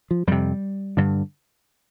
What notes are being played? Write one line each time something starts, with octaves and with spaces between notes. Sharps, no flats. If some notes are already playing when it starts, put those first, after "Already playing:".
F3
F2 C3 G3
G2 D3